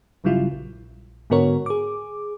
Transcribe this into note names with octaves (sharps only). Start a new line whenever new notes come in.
G1 C#3 F#3 G3 E4 F4
A#1
G#2 D3 B3 F#4 A#4 C#5
G#4 D6